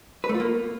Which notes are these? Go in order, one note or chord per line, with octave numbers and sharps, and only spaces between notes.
B4
A3
F4
A#3